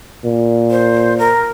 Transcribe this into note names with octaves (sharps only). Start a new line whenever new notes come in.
A#2
C5
A#4